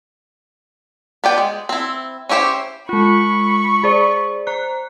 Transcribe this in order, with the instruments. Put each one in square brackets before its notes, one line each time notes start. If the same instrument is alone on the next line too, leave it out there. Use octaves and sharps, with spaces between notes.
[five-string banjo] B3 D5 G5
G#3
C4 E4
C#4 E4 G4 C5 E5
[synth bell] G#3 F4 [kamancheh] B5 C#6
[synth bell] G#4 C5 D5
C5 A#5 F#6